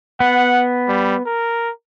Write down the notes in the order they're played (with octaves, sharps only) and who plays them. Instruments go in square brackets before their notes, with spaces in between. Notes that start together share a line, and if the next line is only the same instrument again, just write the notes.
[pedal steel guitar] B3 [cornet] F#5
[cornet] G3
A#4